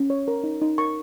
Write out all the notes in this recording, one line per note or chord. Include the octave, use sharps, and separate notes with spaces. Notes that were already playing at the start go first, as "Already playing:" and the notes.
Already playing: C#4
C#5
A#4
D#4
D#4
A#4 C#6